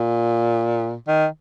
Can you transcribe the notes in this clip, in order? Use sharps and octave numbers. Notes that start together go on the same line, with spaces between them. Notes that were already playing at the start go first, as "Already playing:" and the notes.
Already playing: A#2
D#3